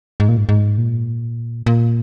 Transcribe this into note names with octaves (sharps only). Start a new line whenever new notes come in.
G#2
A#2
G#2
G#2
A#2
A#2